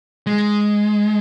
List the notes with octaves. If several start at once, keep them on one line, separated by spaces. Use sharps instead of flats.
G#3